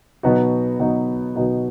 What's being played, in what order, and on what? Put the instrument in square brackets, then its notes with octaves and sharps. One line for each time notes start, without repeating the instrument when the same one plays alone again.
[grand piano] B2 F#3 B3 D#4 F#4
B2 F#3 B3 D#4 F#4
B2 F#3 B3 D#4 F#4